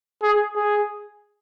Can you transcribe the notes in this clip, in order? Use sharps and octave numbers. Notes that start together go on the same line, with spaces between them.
G#4
G#4